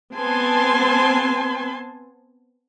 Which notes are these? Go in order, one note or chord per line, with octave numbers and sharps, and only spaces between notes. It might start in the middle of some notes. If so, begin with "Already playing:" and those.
B3 C4 G#5 A5 C6